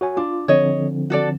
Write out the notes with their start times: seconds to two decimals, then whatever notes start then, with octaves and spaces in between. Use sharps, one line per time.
0.01 F#4 C#5 G#5
0.17 D4 F4
0.48 D3 F3 C4 C#5 D#5
1.10 F#4 A4 D5